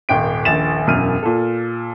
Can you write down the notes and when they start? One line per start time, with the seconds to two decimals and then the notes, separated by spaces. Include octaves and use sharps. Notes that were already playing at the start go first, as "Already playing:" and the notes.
0.09 D#1 G#1 G5 D7
0.45 D#1 A#1 A6 E7
0.87 E1 F#2 F6 D#7
1.23 A#2 A4